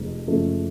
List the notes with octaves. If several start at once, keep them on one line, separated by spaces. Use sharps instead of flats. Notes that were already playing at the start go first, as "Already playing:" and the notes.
Already playing: F1 F2 G#3
F#1 F#2 C#3 F3 A3